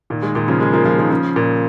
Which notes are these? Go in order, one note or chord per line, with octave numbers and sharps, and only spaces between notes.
A#2 D#3
D#3 G#3
A#2 D#3
C#3 F3
D#3 G#3
F3 A#3
F3 A#3
D#3 G#3
C#3 F3
A#2